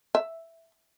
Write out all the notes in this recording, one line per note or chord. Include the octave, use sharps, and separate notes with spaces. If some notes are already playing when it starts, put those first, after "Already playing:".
E5